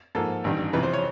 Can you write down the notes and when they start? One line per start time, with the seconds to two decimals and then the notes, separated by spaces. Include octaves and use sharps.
0.15 G#2 F3 A#3 A4
0.44 A1 G2 D#3
0.73 F2 C3 E3 B4
0.83 C5
0.93 C#5